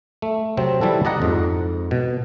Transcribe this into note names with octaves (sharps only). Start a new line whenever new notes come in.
A3
C3 F#3 C4
E3 G3 E4 F#4 A4
D5 D#5 F#5 A#5
F2 G#2
B2